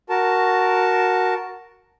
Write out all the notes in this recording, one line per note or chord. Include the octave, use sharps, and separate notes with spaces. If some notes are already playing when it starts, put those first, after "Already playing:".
F#4 A#4 A5